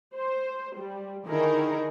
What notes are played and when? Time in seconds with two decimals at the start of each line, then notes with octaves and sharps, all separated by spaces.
0.15 C5
0.77 G3
1.28 D3 D#3 D#4 E4 G#4 A#4